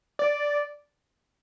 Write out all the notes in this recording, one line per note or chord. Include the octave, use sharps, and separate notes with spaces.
D5